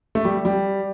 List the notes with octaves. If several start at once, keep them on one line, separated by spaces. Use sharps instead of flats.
A3
G3
G3